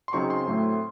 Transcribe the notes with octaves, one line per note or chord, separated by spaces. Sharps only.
C6
C#3 F#3 C4 D#4 C#6
C6
A2 F#3 A3 C4